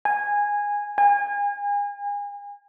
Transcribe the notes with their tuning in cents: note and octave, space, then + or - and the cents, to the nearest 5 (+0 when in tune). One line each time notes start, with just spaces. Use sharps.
G#5 -15
G#5 -35